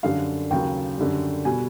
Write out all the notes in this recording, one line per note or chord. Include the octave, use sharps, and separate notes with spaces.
F#2 D3 G3 F5
D#2 C#3 F#3 G5
F#2 D3 G3
B2 G3 G#5